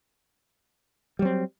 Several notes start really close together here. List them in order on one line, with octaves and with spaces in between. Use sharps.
G3 F#3 C4